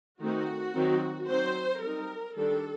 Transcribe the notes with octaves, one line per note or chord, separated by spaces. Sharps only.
D#3 A3 C4 D#4 F#4
D#3 F#3 C4
F#3 C4 D#4 C5
G3 C4 D#4 A#4
D#3 G3 D4 A4